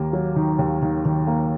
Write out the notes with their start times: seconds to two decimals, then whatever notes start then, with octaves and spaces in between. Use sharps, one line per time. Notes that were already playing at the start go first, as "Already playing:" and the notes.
Already playing: D#2 A#3
0.13 F#3
0.36 D#3
0.59 D#2
0.82 D#3
1.05 D#3
1.27 A#3